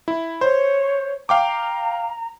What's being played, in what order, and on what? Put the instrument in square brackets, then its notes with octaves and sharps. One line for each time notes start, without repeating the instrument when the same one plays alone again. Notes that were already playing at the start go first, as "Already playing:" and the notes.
[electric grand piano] E4
[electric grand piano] C5 [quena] C#5
[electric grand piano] F5 G5 D6 [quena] A#5